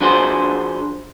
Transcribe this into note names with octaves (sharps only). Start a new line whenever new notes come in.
F3 D4 F#4 G#4 C5